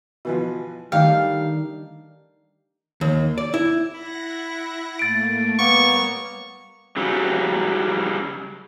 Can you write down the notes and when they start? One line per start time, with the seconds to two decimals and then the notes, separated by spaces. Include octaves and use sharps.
0.25 B2 E3 F3
0.92 D#3 G3 A3 D4 F5 G5
3.01 D#2
3.38 D5
3.54 E4
3.95 E4 F#5 A#6
4.99 A2 A3 A#3 A6 D7
5.59 G3 A#3 B3 A#4 C#5 C#6
6.97 C#3 F#3 G3